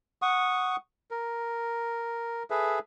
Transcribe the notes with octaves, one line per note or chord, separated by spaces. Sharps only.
F#5 C#6 D#6
A#4
G#4 A4 B4 E5